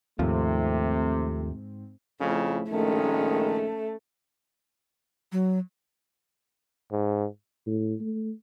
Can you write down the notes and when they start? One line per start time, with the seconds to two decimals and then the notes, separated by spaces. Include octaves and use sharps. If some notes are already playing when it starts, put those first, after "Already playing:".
0.19 D#2 G#2 C3 F3 A3 C4
2.21 F2 C#3 F3 A3 E4
2.71 A#1 D#3 G#3 A3 C#4
5.32 F#3
6.92 G#2
7.67 A2
8.01 A3